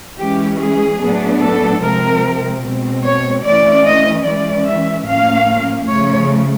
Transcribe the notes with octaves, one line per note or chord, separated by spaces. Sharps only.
E3 G#3 C#4 G4
G#4
A2 F#3 B3 D4
A4
C3 F3 G#3 C4 A#4
B2 G#3 C4
C#5
E3 A3 C#4 D5
D#5
E3 G#3 C#4 D5
E5
A2 F3 A#3 C#4 F5
C#3 F3 A3 C#5